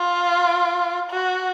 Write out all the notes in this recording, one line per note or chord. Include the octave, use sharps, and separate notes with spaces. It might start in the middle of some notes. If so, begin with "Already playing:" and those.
Already playing: F4
F#4